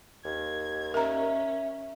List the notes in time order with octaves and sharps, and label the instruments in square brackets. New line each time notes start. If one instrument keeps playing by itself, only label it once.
[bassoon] D#2 [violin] G#6
[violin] C#4 [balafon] A#4 A#5 [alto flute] E5